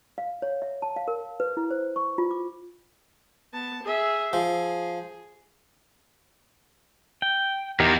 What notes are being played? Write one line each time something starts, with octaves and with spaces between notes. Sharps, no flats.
F5
C#5
E5
A5
F5
A#4
B4
E4
C5
C#6
F4
D6
B3 A5
G#4 E5
F3 G#4
G5
E2 D#4 G4 A#4